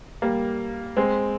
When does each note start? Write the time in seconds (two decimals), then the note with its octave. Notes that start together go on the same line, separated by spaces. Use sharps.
0.22 G3 A#3
0.97 G#3 C4